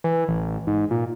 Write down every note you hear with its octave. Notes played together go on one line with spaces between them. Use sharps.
E3
A1
G#2
A#2